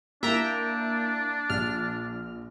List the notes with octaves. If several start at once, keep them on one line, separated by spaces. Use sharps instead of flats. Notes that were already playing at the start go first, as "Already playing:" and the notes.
A#3 D4 E4 E5 G5 A#5
A#1 F6